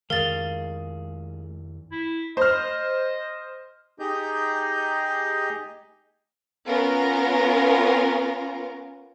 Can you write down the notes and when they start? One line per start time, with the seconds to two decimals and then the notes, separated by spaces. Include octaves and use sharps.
0.10 F2 D#3 G#3 G#4 A#4 F5 A6
1.92 E4
2.37 C5 D#5 F6
3.99 D#4 G4 G#4 D#5 G6
6.67 B3 C#4 F4 A#4